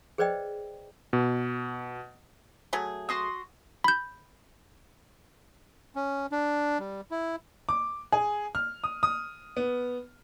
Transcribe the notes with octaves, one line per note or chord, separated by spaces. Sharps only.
G#4 B4 C5 D5 D#5 G5
B2
F#3 A3 G#4
F#4 C6 D#6
B5 G6
C#4
D4
G3
E4
D6
G#4
F6
D#6
D#6
B3